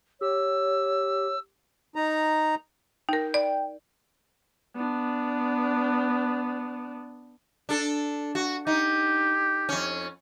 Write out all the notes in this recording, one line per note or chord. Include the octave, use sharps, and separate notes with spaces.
G4 C#5 E6
D#4 A#5
D#4 A#4 G5
D5
B3 D4
D4 A4
F#4
D#4 G4
F2 C#4